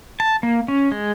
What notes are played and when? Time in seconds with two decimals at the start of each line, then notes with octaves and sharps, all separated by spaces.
0.20 A5
0.43 A#3
0.68 C#4
0.92 G#3